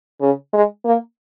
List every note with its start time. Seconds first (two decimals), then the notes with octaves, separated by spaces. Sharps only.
0.21 C#3
0.53 G#3
0.85 A#3